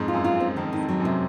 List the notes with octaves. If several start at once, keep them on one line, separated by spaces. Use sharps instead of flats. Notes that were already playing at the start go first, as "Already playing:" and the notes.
Already playing: F2 G#2
F4
F#2
F4
F#2 C4
F2 D#3
D#3
F2
F#3
F#2
C3